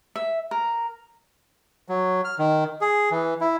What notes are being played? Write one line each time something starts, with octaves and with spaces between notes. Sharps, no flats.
E5
A#4
F#3
F6
D#3
G#4
E3
E4